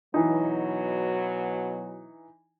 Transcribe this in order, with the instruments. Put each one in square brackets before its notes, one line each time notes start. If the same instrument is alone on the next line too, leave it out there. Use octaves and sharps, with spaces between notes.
[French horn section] B2 F#3 [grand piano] E3 D#4